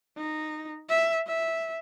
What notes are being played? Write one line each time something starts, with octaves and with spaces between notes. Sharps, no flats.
D#4
E5
E5